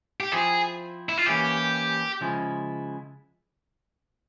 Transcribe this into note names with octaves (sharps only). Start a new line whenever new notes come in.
G4
F3 C4 E4 G#4
E4
F4
E3 A#3 C#4 E4 G4
C#3 F3 G#3 E4